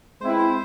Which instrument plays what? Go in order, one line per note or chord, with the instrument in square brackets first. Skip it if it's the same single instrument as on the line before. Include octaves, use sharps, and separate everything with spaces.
[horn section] G#3 C4 E4 [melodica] C5
[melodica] B4
C5